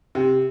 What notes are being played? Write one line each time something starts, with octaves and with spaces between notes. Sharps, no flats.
C3